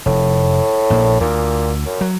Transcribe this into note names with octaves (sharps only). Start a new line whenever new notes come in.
F1 A2
A#1 A#2 A#3
D2 A#2
F#2
F#3